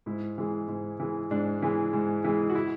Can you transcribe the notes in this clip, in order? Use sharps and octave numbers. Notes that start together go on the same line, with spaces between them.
G#2 E4
E3 G#3
G#2
E3 G#3
G#2 D4
E3 G#3
G#2
E3 G#3
F#4
E4